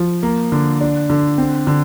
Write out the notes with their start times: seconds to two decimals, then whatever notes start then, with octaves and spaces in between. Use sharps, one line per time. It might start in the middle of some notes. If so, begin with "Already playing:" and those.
Already playing: F3
0.23 A#3
0.52 D3
0.81 D4
1.10 D3
1.38 C4
1.67 D3